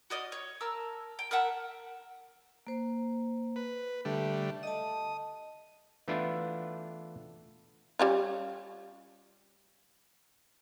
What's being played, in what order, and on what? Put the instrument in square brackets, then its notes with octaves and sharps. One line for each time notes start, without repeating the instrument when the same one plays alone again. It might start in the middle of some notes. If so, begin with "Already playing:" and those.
[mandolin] F#4 D5 D#5 F6
C#5
A#4 A5 E6
G5
A#4 E5 F#5 A5
[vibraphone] A#3 C5
[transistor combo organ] B4
[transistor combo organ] D3 G3 A3 [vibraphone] A4 E5
[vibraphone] D#5 A5 [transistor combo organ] D#6
[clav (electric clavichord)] E3 A3 B3 D4 E4 F4
[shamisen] G3 C#4 F4